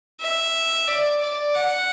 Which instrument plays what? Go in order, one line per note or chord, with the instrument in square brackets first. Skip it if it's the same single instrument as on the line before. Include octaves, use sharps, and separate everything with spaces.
[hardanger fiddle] E5
D5
D5
F#5